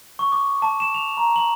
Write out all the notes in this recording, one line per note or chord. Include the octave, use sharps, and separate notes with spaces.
C#6
D6
A5
E7
F7
A#5
F#7